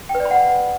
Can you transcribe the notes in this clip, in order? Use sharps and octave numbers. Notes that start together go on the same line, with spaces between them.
G5
B4
D5
B5
F#5